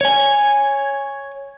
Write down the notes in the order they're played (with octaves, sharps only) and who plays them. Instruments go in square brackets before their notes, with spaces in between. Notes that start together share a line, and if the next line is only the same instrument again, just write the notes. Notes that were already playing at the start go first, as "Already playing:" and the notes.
[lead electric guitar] C#5 G#5